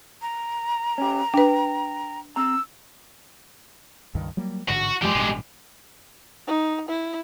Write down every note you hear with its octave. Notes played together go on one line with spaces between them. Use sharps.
A#5
C#4 G4
D4 B4 G5
C4 A#5 E6
C#2 G2 D#3
F#3 G3 A#3
A1 G#2 D3 F#4
F#2 E3 F3 G#3 G4
A1 G2 B2
D#4
E4